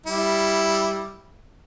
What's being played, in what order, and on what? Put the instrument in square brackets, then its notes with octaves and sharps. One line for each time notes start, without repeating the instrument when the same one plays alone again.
[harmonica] G3 E4